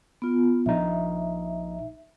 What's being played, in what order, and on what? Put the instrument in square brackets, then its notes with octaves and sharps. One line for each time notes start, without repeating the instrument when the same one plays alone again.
[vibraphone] B3 F4
[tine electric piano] A#1 D#4 [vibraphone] E5